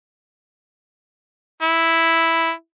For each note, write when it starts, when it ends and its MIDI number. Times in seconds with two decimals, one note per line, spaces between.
1.62 2.51 64